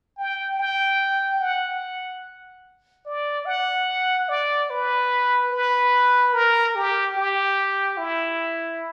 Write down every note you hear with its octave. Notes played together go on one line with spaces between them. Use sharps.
G5
G5
F#5
D5
F#5
D5
B4
B4
A#4
G4
G4
E4